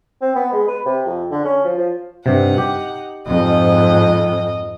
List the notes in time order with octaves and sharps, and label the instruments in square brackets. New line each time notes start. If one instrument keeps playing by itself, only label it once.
[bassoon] C4
B3
G#3
B4
C3
F2
D3
C#4
F3
F3
[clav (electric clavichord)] G2 C3 [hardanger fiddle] D#4 F#5
[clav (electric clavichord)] G4
[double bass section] F2 G#2 [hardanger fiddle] D#5